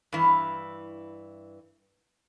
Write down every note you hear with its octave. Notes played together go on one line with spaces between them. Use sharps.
G2 E3